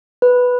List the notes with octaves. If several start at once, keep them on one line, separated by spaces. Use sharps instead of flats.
B4